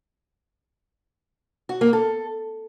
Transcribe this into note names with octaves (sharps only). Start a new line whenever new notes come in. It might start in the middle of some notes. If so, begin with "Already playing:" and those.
F#4
A#3
A4